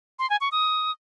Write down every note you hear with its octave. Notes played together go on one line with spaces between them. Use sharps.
C6
G#5
C#6
D#6